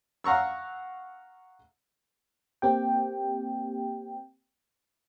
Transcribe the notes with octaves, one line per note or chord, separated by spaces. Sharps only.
F5 F#5 A#5 C#6 E6
A#3 C4 G4 G5